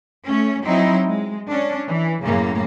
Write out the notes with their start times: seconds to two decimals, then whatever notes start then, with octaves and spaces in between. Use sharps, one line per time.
0.27 A3 C#4
0.64 F#3 C4 D#4 E4
1.08 G#3
1.47 C#4 D4
1.88 E3
2.23 F#2 A2 C#3 A#3